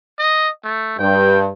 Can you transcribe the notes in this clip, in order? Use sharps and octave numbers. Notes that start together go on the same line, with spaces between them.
D#5
A3
G2 G5